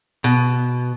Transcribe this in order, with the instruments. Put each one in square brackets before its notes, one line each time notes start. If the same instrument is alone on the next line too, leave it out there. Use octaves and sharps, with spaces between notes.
[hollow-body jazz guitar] B2